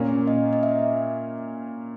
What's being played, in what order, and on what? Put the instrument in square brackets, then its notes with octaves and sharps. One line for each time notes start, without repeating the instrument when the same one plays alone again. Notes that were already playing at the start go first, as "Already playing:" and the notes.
Already playing: [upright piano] A#2 A#3 C#4
[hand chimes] D#5
D#5
E5